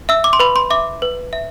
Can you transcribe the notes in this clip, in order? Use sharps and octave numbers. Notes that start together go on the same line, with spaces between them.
E5 E6
D6
C6
B4 B5
C6
E5 D6
B4
E5